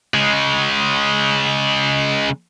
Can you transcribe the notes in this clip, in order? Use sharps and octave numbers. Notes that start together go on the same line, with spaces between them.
C#3 G#3